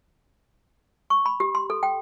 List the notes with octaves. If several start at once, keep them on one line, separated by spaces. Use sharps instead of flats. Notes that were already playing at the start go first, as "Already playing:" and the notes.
C#6
B5
G4
C6
A4
G5